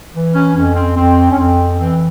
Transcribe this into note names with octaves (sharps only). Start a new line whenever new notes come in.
E3
C#4
F2 C#4
C4
F2 C4
C#4
F2 C4
E3 C4